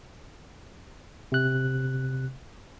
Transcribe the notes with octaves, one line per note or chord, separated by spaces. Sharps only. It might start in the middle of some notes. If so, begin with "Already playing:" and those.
C3 F#6